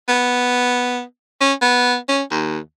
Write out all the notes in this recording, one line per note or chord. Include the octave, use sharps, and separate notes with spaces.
B3
C#4
B3
C#4
D#2